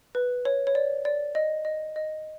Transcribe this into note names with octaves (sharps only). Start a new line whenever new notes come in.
B4
C#5
C#5
D5
D5
D#5
D#5
D#5